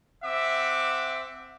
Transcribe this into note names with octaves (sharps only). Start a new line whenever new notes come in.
C4 E5 F#5 D6